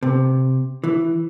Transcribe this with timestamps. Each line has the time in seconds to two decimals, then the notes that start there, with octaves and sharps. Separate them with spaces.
0.03 C3
0.84 E3